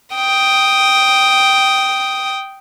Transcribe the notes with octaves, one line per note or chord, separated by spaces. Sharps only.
G5 D#6